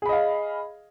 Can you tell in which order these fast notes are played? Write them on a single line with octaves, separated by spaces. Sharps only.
G#4 B5 D#5 F5